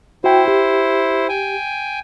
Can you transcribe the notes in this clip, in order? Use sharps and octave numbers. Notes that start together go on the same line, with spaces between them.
E4 F#4 C5 G5
G4
G5 G#5